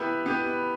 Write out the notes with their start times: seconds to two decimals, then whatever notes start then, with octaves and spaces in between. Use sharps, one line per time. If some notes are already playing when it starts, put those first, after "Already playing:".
Already playing: B3 E4 G4 B4 B5
0.26 B3 E4 G4 B4